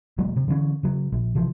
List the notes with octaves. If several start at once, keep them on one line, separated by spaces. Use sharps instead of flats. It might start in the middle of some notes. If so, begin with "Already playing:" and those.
E1 F#3 G#3 A#3
C3
D3 E3 B3 C#4
C#3 F#3
A#1
C3 E3 F3